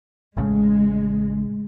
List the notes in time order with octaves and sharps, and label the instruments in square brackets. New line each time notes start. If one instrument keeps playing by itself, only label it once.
[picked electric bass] A1 A2 C#3 [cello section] G#3